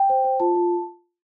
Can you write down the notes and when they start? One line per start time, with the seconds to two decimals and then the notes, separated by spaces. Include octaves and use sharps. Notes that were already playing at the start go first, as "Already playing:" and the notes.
Already playing: G5
0.09 C5
0.24 C5
0.40 F4 A5
0.55 F4